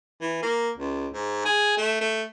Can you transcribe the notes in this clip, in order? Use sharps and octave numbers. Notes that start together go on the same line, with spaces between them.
E3
A#3
C#2
G#2
G#4
A3
A3